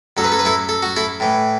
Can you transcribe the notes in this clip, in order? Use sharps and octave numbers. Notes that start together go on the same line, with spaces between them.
F#2 F#3 A4
B4
A4
B4
E4 A4
A4
F#4
E4 A4
A2 E3